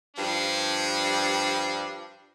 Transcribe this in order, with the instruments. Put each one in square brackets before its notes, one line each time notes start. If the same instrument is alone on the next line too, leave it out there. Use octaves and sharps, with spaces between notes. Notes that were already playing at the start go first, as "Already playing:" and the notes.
[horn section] G2 F3 D4